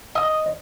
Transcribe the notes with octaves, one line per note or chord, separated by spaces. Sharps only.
D#5